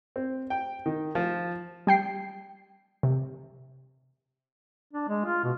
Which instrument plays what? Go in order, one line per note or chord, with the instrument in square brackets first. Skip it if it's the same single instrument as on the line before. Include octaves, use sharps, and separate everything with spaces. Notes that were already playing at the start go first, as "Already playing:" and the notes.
[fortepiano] C4
G5
D#3
F3
[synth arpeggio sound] G3 G5 C7
C3
[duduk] D4
G#3
F4
B2